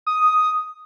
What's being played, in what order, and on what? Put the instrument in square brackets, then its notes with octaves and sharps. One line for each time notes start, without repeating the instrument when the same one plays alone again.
[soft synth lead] D#6